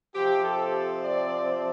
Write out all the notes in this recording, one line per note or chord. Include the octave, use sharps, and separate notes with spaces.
C3 F3 C4 G4
A4
D5